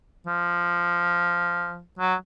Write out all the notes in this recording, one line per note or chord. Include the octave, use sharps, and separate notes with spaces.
F3
F#3